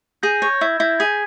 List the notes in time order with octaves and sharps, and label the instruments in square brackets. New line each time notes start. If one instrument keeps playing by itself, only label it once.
[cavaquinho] G#4 [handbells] G6 A#6
[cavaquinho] C#5 [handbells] G6 A#6
[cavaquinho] E4 [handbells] E6 G#6
[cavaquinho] E4 [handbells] G6 A#6
[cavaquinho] G#4 [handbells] G#6 B6